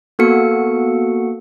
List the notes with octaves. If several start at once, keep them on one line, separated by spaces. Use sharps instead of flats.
A#3 B3 F#4 A4 C#7